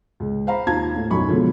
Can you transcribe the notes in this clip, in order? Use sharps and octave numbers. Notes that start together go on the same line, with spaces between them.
C#2
C5 F5 A#5 B5
D#2 F4 A5 A#5 G#6
A2
B1 F#2 F#3 B5 C#6
G#2 B2 D3 F3 F#3